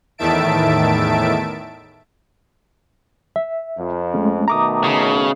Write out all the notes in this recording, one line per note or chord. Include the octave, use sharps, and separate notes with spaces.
E2 A2 D#3 E5 A5 D7
E5
F2
G#3 A3 C#4
B2 D#3 A3 A#5 D6 D#6
C#3